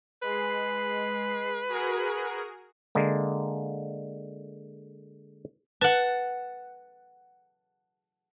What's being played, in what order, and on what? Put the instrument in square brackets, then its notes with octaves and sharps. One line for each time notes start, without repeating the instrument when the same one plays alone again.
[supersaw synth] G#3 C7 [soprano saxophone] B4
[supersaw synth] F#4 G#4 A#4
[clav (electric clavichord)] D3 G#3 A#3
[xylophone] B4 [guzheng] F#5 A5